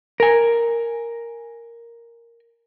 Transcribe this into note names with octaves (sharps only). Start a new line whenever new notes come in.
A#4 G#5